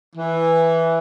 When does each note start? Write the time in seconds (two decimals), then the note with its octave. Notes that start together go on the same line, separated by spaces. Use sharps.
0.16 E3